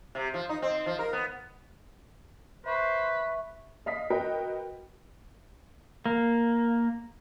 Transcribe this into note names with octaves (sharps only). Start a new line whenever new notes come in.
C3
F3
D#4
C4
F3
A#4
B3
B4 C5 E5 C#6
D#5 F5 D#6 B6
F#4 A#4 B4 D#5 G5
A#3